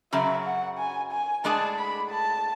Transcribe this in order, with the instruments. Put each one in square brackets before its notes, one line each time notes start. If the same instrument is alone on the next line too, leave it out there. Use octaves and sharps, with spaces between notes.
[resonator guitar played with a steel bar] F#2 C#3 F#3 [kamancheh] E5
[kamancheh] F#5
G#5
G#5
[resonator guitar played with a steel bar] A2 G#3 D4 G#4 D5 [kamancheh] A5
[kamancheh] B5
A5